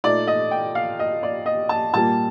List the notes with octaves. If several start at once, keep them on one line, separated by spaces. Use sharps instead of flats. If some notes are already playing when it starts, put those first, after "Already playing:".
A#2 A3 D#4 D5
D#5
G5
F5
D#5
D5
D#5
A5
A#2 G3 A#3 A5